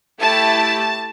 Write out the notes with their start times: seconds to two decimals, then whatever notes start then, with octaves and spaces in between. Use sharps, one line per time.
0.20 A3 E4 G4 A5